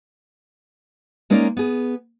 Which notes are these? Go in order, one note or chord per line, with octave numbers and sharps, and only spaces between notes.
G#3 A#3 C#4 D#4 D5
B3 G#4